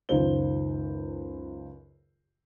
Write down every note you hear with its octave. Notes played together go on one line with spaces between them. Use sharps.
C#2 F#2 D#3 F4 C5 G7